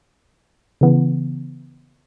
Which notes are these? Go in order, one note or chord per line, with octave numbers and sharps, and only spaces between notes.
C#3 E3 B3